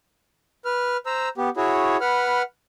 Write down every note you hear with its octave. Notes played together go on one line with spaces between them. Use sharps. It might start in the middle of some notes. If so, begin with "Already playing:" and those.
B4 F6
C5 A#5 E6
B3 G4
E4 F#4 G#4 C#5
B4 F#5 B5 F6